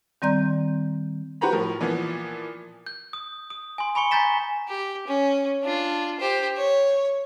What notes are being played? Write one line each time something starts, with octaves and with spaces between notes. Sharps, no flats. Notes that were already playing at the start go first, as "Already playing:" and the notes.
D#3 G3 C4 D5 A#5 G6
F#4 G4 B4 C5 A#5 B5
A2 F3 A#4
A#2 E3 F3 B3
G6
D#6
D#6
G#5 C6
G#5 B5 C#6 C#7 G7
G#5 A#5 G6 A6 B6 E7
G4
C#4
D4 F4
G4 C5
C#5